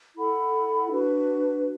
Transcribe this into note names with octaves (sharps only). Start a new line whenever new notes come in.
E4 A4 F#5 B5
D4 F#4 B4